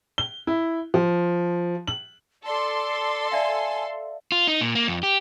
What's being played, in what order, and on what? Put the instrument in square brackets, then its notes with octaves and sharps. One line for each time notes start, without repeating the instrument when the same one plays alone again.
[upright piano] G7
E4
F3
F#7
[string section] A4 C6 [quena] D5
[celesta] D5 E5 F5 [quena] G#5
[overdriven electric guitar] F4
D#4
A#2
A#3
F2
G4